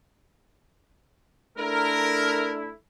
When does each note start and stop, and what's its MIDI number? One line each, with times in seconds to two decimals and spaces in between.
1.58 2.70 57
1.58 2.70 62
1.58 2.70 64
1.58 2.51 70